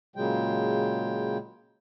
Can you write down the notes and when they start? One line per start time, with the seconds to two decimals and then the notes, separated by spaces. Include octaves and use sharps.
0.16 A#2 C#3 F#3 G#3 G5